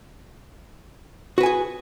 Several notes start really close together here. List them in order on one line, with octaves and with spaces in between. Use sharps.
F#4 B4 G#5 G#4